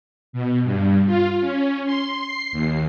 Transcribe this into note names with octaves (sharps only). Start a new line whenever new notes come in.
B2
G2
F4
C#4
C6
C7
D#2